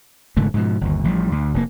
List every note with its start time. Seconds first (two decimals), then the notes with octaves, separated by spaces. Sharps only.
0.37 F1 G#2 D3 A3
0.54 G#2 B2 F3
0.81 G1 D#2
1.04 A1 F3 G3
1.32 D2
1.54 F1 B2 A#3